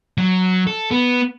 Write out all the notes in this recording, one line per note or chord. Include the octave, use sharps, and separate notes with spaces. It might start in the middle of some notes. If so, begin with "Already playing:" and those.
F#3
A4
B3